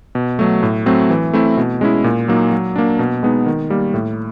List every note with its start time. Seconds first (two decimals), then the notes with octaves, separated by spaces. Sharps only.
0.15 B2
0.39 F#3 A3
0.63 A2
0.86 F#3 A3 C4
1.10 E3
1.33 A3 C4 E4
1.57 B2
1.81 G#3 C#4 E4
2.04 A#2
2.28 F#3 A#3 D#4
2.52 F#3
2.76 A#3 D4
2.99 B2
3.23 G#3 B3 D#4
3.46 D#3
3.70 G3 A#3
3.94 A2